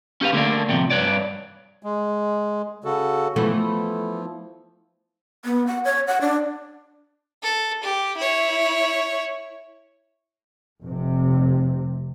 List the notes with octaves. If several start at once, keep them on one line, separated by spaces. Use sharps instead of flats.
C#4 G4 B4 F5
D3 A3 A#3 D4
A2 C3 F3
G2 B4 C#5 D5
G#3
C#3 F#4 A4
E3 F3 A3 B3
B3
F#5
C#5
F#5
D4
A4
G4
E4 C#5
F1 C3